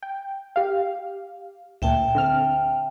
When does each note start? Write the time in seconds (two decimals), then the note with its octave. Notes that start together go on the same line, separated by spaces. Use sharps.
0.03 G5
0.56 G4 F5
1.82 D2 A#2 E5 G5 A5
2.15 D3 C4 F6